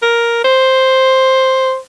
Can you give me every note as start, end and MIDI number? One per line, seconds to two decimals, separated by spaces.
0.02 0.40 70
0.44 1.77 72